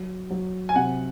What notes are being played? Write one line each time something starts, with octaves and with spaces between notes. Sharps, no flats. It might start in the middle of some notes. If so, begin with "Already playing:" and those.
Already playing: F#3
F#3
G#5
C3 F#5